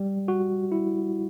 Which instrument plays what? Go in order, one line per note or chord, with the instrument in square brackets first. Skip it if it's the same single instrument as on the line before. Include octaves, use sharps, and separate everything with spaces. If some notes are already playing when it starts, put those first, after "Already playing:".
Already playing: [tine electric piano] G3
F#4
E4